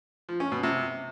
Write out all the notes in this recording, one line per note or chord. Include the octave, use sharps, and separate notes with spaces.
F3
C#4
B2
C3